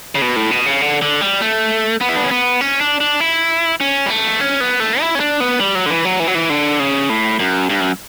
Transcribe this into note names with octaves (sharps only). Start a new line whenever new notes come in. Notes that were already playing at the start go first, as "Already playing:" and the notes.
C#3
B2
A2
B2
C#3
D3
D3
G3
A3
B3
E4
D4
C#4
B3
C#4
D4
D4
E4
C#4
G3
A3
C#4
B3
A3
E4
C#4
D4
B3
G3
F#3
D3
E3
F#3
E3
F#3
E3
D3
C#3
A2
F#2
G2
F#2